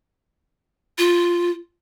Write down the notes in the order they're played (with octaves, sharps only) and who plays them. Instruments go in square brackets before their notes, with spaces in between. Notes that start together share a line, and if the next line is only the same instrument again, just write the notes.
[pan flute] F4